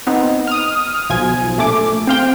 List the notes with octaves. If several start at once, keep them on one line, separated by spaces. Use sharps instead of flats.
B3 C4 D#4
D#6 F6
B1 F3 G#5
A#1 A3 D6
C4 F5 G5